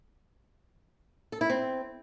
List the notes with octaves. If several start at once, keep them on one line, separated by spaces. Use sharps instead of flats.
A4
E4
C4